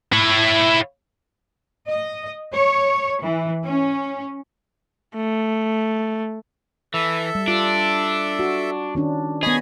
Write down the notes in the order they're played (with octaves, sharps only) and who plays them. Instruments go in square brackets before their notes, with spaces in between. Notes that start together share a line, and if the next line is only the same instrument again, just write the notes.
[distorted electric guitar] E4 C#5
[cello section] D#5
C#5
E3
C#4
[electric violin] A3
[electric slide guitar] E3 [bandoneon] A4 E5
[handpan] G3
[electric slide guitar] D4 [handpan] F4
[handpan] F#4
D#3 C#4 D4
[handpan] B3 D#5 [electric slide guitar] G#4 [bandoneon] C#5 G#5 B5